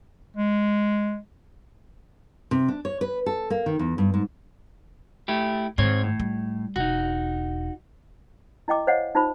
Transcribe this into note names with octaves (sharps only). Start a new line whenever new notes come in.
G#3
C3
D4
C#5
B4
A4
A#3
D#3
E2
G2
G#2
A3 E4 G4
G#2 D#3 C4 C#5
A2
G3
E1 D#4 F#4
E4 D#5 G5 D6
C5 C#5 D#5 F5 F#5
D#4 F4 C5 B5